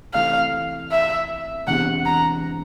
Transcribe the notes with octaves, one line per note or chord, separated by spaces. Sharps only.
C3 E3 A3 C4 F5
E5
E1 E2 C3 F#5
A#5